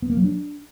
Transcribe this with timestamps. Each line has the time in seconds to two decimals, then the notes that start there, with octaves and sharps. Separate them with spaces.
0.02 B3
0.10 A#3
0.17 F#3
0.24 D4